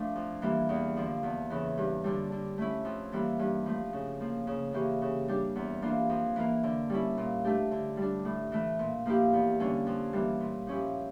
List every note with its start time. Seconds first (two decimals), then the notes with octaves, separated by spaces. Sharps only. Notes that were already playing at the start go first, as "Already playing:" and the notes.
Already playing: F3 A3 D4
0.16 F2
0.42 E3 G3 A#3
0.69 E2
0.96 D3 F3
1.23 E2
1.50 C#3 E3
1.78 G2
2.04 D3 G3
2.32 D3
2.58 A3 C#4 E4
2.85 F2
3.12 E3 G3 A#3 E4
3.39 G2
3.66 F3 A3
3.93 C#3
4.21 F3 A#3
4.47 C#3
4.73 E3 A#3 C#4 G4
5.02 C#3
5.28 G3 D4 G4
5.56 E2
5.82 E3 A#3 D4 F4
6.10 F2
6.36 E3 A#3
6.63 D3
6.90 G3 C#4 E4
7.17 A#2
7.44 A3 D4 G4
7.71 D3
7.97 G3 D4
8.25 A2
8.52 E3 A3
8.79 A#2
9.06 F3 A#3 E4 G4
9.33 E2
9.59 D3 G3 A#3 C#4
9.87 F2
10.13 E3 G3 A#3
10.40 A#2
10.67 F3 C#4 E4 G4